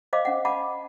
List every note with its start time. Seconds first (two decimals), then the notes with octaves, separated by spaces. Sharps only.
0.13 C5 D#5 F5 D6
0.25 C#4 F#5
0.45 F#5 A5 B5 D6